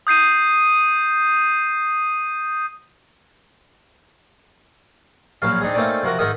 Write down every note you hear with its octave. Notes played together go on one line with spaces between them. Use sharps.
D#6 G6 C7 D#7
A#1 F#3 C#4 F5
C4 D4 D#4 G#4
A3 A#3 C4 C#4 D#4 D5
C3 F3 F#4 A#4
G#2 D#3 D#4 A#4 E5 D#6